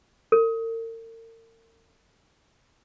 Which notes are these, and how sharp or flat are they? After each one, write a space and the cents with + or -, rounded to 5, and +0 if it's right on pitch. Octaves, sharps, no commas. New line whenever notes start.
A#4 -45